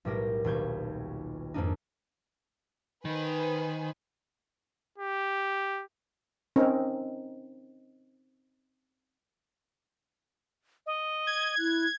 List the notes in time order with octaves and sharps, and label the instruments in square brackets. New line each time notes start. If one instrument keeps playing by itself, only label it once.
[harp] B1 A2 G3 G4 A#4 A#6
D#1 B1 G4 G6 G#6
F2 G#2 A#3 D4 D#4
[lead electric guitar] D#3 [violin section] B4 C5 G#5
[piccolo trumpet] G4
[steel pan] C4 C#4 D#4 A#4
[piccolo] D#5
[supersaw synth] G#6
[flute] E4 [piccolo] F#6